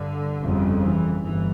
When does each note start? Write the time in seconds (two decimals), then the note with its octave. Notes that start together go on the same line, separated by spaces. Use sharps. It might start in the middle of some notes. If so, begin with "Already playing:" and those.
Already playing: G2 D3
0.42 G1 F2 C#3
0.82 E3
1.23 G1 E3